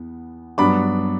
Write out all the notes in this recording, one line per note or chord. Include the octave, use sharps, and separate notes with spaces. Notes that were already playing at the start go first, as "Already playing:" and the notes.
Already playing: E2 B3
G2 F#3 B3 D4 B5 D6